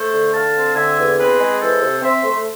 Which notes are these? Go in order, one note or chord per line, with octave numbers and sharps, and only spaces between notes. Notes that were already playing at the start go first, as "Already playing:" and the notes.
Already playing: A3 A4 C5
D3
D3 F5 A5
C4
D3 E5 G#5
E2
C4 G#4 B4
G#3
E3 A4 C5
C3
C4 C5 E5
A3